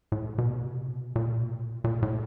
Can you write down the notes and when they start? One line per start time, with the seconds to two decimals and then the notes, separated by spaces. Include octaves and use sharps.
0.12 A2
0.38 B2
0.64 C3
0.90 B2
1.16 A#2
1.41 B2
1.84 A#2
2.02 A2